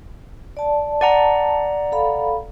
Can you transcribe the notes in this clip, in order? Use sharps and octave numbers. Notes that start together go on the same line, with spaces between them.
D5 A5
D5 F#5 A5 A#5
A4 F5 B5